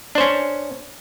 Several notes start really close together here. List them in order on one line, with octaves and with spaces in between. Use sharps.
D4 C5 C#4